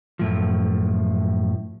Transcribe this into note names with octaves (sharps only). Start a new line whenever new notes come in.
F#2 A2 F3